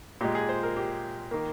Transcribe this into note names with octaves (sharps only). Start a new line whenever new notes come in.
A#2 G#3 G4
G#4
C5
A#4
G4
D#3 A#3